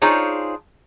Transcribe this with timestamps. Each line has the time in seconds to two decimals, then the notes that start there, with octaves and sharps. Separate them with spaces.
0.02 D4 D#4 F4 G#4 C5 C#5